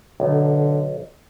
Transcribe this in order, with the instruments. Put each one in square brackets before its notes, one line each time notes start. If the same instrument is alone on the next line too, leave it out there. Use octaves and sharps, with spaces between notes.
[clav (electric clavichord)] B1 [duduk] D3